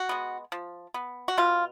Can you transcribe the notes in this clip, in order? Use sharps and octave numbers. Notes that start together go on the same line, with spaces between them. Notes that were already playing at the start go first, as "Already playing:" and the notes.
Already playing: F#4
G#3 B3
F3
B3
F#4
B2 F4